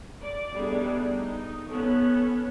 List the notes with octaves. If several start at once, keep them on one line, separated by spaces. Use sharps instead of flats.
D5
G3 A3 B3 D4 D#4 G#4
D#4
B3 C#4 A4 C#5